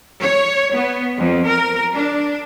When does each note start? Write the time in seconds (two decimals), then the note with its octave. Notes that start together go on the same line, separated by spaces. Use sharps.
0.20 C#5
0.73 B3
1.17 F2
1.46 A#4
1.93 D4